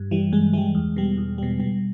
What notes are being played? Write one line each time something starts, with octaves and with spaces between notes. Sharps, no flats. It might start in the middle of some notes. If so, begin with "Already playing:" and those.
Already playing: G2
E3 G3
G2 G#3
E3 G3 G#3
E2
B2 G3
E2
B2 G3
B2 G3